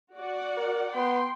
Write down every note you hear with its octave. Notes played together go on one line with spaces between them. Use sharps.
F#4 D5 F#5
A#4
B3 G5 C6